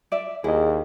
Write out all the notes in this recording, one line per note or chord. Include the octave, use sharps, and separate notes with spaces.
D5 E5
D#2 E4 G#4 D#5